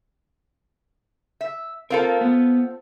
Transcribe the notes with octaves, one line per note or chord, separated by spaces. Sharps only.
E5
C4 F4 A4 A#4 F5
B3